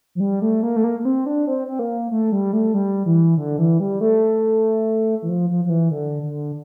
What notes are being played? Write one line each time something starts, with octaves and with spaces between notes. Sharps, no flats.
F3
G3
A3
A#3
A3
A#3
A#3
C4
D4
C4
C4
A#3
A3
G3
A3
G3
E3
D3
E3
G3
A3
E3
F3
F3
F3
E3
D3
D3